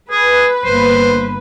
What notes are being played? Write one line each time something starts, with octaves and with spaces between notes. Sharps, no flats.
G#4 B4
G1 A#3 C5